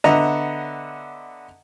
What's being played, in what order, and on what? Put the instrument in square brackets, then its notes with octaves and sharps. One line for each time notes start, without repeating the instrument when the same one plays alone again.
[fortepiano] D3 B3 D#5 E5 A#5